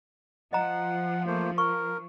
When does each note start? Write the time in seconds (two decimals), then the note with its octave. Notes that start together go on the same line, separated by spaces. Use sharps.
0.53 F3 D#5 F#5 A#5
1.27 A3 A#3 C5
1.58 A#4 C#6